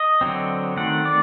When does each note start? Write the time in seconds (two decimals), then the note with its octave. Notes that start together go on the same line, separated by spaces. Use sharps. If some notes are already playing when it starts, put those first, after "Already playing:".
Already playing: D#5
0.21 D3 F#3 C4
0.76 D#3 A3 C4 F#5
1.05 D5